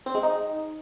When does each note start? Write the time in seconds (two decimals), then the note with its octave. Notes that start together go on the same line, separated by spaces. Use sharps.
0.06 C4
0.15 G#3
0.23 D#4